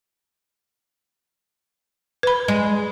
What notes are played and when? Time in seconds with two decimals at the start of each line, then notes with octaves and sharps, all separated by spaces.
2.23 B4 B5
2.48 G#3